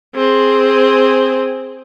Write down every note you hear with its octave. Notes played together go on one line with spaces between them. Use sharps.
C4 G#4